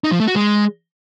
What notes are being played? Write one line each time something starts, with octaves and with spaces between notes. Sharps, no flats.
D#4
F3
A3
F#4
G#3